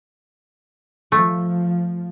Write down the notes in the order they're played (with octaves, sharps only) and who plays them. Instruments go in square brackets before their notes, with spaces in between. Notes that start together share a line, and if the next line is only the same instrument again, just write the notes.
[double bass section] F3 [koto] A3